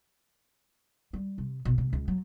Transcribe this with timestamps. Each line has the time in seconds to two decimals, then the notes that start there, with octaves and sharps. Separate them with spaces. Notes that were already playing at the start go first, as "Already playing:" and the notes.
1.13 G3
1.38 C3
1.65 A1 B2
1.78 C3
1.93 C#2
2.08 F#3